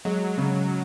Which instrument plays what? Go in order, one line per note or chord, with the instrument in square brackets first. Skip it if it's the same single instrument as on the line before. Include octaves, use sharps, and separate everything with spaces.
[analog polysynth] F#3 [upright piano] G#3
[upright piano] C#3